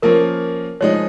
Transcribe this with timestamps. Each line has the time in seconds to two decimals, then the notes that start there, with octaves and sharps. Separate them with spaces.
0.02 F3 A#3 C#4 A#4
0.81 F3 G#3 D#4 C#5